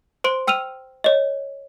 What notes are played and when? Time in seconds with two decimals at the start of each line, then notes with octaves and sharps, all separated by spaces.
0.24 C5 C6 D7
0.47 G5 E6 F6 D#7 F7
1.04 C#5 D#5